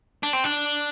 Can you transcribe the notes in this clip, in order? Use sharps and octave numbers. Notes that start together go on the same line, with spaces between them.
D4
C4
D4